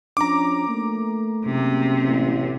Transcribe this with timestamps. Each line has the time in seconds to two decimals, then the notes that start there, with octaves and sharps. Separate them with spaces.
0.17 F3 C#4 D4 A#5 D6
0.67 A3 A#3
1.46 F#1 C3
2.03 A1